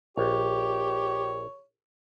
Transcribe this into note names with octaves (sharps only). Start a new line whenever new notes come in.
A#1 G4 C#5